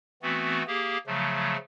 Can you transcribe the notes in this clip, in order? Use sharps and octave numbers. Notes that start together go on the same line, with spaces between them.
E3 A3 B3 C4 F#4
A#3 G4 G#4
C#3 F3 F#3 A3